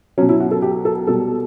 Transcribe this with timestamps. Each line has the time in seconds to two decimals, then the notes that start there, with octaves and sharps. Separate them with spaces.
0.18 F#3 C#4
0.21 B2
0.29 E4
0.40 F#4
0.51 A4
0.62 G4
0.85 A4
1.07 B2 G3 A4